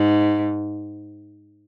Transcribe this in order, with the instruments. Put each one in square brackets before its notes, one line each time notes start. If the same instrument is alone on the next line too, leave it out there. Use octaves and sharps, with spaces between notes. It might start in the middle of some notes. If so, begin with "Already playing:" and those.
Already playing: [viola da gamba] G#2